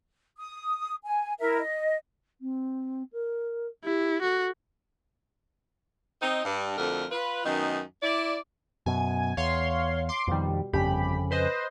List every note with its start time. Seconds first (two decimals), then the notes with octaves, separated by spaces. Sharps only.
0.38 D#6
1.05 G#5
1.40 E4 A#4 E5
1.60 D#5
2.41 C4
3.12 A#4
3.83 E4 G4
4.22 F#4 A4
6.22 C4 D#4
6.44 G2
6.77 F2 D3 A3 F#4 A#4
7.11 F4 B4
7.45 F#2 D#3 B3 D#4
8.02 E4 D5
8.86 F#2 B2 G#5
9.37 E2 C#5 F5 C6
10.09 C6 D6
10.28 F2 B2 D#3 G3
10.73 G1 F2 C#3 G4 B5
11.31 B4 C5 D#5